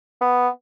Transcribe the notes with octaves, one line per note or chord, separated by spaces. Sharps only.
B3